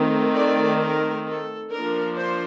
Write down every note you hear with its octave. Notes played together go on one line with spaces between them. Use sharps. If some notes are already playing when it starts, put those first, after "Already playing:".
Already playing: D#3 A3 C4
D5
A#4
A4
F3 A#3 D4 A#4
C5